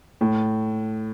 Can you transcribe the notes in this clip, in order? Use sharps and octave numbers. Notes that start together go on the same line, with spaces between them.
A2